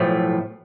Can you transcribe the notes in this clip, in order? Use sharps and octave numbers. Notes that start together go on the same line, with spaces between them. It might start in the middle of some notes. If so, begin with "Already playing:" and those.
Already playing: B1 A2 F3 A3